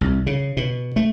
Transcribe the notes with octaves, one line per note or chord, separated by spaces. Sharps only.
C2
C#3
B2
A3